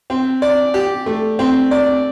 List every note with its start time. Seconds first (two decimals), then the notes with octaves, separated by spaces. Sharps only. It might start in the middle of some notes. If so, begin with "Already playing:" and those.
0.10 C4
0.42 D5
0.74 G4
1.06 A3
1.39 C4
1.71 D5